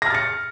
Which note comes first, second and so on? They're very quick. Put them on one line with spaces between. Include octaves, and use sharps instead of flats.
A#6 F6 A6 C#7